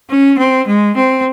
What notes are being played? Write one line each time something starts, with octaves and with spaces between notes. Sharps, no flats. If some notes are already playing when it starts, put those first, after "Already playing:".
C#4
C4
G#3
C4